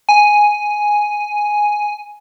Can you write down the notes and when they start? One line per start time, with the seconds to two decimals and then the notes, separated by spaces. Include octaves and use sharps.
0.09 G#5